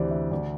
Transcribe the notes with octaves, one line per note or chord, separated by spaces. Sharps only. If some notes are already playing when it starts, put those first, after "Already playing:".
Already playing: D2 C3 E3 C5 D5
E5
D2 D5